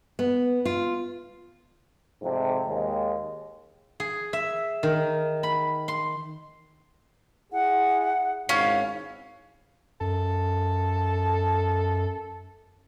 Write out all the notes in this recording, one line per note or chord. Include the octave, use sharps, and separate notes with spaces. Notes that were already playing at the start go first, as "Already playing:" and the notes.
B3
F4
F2 G#2 C3
D#2 G#3
G#4
E5
D#3
B5
C6
E4 G#4 F#5
G#1 G#2 C#4 E4 F#4 F5
F#2 A4